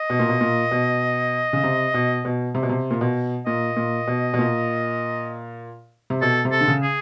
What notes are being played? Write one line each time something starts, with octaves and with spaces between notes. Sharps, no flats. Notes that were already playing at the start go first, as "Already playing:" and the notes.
Already playing: D#5
B2
A#2
B2
A#2
B2
C#3
C3
B2
B2
C3
B2
C3
A#2
B2
A#2 D#5
A#2
B2
B2
A#2
C3
B2 A4
C3
A4
D3
C#3
G#4